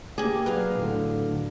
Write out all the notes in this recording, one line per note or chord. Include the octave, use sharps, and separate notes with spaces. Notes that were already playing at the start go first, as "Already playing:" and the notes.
A#3 G4 G#4
F#3 D4 B4 F5
A2 D3